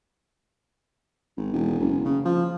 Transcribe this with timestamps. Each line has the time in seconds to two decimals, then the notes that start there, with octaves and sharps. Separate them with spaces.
1.37 G#1
1.53 E1
1.80 F#1
2.05 C#3
2.25 F3